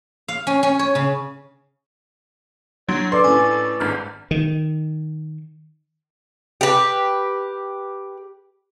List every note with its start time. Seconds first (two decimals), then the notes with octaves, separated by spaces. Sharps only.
0.28 F5
0.47 C#4
0.63 C#4
0.79 C#5
0.95 C#3
2.89 F#3 D4 C#5 C6
3.12 A4 B4 D5 C6 D6
3.24 A2 C#4 G#5
3.80 G#1 G2 F6
4.31 D#3
6.61 G4 B4